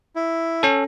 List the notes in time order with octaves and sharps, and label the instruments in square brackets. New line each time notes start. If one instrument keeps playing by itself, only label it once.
[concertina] E4
[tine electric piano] C#4 A4